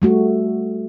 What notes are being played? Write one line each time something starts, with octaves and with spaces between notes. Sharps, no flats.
G3 A3 F#4